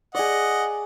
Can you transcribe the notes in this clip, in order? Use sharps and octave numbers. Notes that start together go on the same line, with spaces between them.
G#4 D5 D#5 F#5